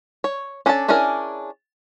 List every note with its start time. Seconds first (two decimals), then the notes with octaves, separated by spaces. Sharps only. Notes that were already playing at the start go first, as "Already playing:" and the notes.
0.24 C#5
0.66 C#4 D4 A4 E5 A5
0.88 C#4 D4 E4 G#4 A#4